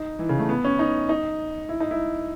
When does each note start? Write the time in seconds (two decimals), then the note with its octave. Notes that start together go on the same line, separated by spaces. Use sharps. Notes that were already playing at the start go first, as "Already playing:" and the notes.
Already playing: D#4
0.19 E3
0.29 C#3
0.39 A3
0.49 B3
0.64 C#4
0.79 D#4
1.09 D#4
1.69 E4
1.80 D#4
1.91 E4